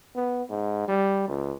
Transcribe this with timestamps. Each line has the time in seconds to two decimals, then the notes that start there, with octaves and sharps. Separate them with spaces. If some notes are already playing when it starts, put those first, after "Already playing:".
0.16 B3
0.50 G#2
0.88 G3
1.28 C#2